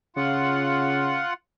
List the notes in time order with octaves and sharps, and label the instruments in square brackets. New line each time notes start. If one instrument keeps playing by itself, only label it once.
[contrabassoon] C#3 [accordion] F4 F#5